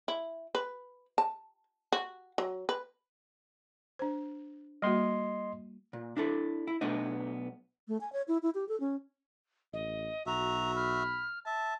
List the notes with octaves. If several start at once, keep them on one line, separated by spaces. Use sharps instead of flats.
E4
B4
A5
F#4
F#3
B4
D4 C5
G3 A#3 F#4 D#5 C6
A#2
D4 E4 A4
E4
B1 A3 B3 D4 D#5
A3
G#5
C#5
E4
E4
G4
A4
C#4
A1 D#5
B1 F#4 E5 A#5
B5 F6
E5 A5